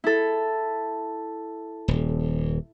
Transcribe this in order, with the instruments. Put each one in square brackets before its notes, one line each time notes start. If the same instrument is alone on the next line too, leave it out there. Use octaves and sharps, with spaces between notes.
[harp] E4 A4
[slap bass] D#1